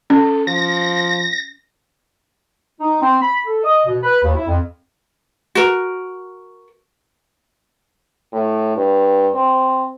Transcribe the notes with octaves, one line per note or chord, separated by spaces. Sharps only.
C#4 A4
F3 A#6
D#4
C4
B5
A4
D#5
B2
B4
D#2
E4
F2
F#4 A#4
A2
G2
C4